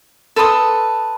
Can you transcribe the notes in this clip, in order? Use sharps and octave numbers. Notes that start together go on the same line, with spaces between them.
A4 B4 C6 D#6